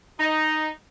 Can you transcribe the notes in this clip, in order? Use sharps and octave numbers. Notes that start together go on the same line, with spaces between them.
D#4